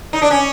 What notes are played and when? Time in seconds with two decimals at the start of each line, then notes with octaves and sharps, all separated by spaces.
0.13 D#4
0.22 D4
0.31 C#4